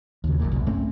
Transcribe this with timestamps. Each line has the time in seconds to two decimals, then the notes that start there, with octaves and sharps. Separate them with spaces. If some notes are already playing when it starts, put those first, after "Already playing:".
0.24 D#2 C#3
0.40 A1 F#2 A#2
0.52 C2 F#2 A#2
0.66 G#2 A3 C4 C#4